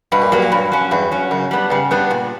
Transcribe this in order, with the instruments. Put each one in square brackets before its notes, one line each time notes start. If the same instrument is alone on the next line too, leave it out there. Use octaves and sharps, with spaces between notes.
[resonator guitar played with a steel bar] G2 [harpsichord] B2
[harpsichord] A#2
[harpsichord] G2 [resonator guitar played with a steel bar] F#3 A#3
[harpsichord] A#2
[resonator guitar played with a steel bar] G2
F#3 C#4
[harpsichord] E2 [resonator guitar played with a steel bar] G2
[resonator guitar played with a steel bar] F#3 C#4
[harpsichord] F#2 [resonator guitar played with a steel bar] C#3
[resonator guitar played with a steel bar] G3 B3 D4
[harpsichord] G2 [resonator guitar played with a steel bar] C#3
[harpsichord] G2 [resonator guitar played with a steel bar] G3 B3 D4
[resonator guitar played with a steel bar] A#2